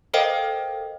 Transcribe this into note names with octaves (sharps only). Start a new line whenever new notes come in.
A4 A#4 C5 D#5 F5 G5